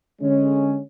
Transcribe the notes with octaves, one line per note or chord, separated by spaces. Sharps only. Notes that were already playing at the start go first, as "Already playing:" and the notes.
D3 G#3 C#4